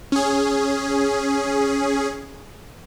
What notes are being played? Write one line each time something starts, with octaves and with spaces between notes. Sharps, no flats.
C#4 G#4